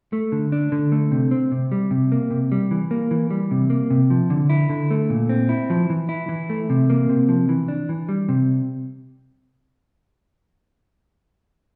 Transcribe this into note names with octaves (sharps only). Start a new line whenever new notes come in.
A3
D3
D4
D3
A3
C3
C4
C3
G3
C3
A#3
C3
G3
E3
A#3
E3
G3
C3
A#3
C3
F3
D3
E4
D3
A3
A#2
C4
E4
F3
E3
E4
E3
A3
C3
A#3
C3
F3
E3
D4
E3
G3
C3